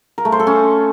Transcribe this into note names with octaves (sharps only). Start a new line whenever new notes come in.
A#4
A3
C5
A4
C#4